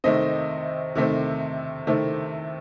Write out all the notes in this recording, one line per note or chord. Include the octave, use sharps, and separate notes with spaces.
C3 D#3 A3 C4 D#5
C3 D#3 A3 C4
C3 D#3 A3 C4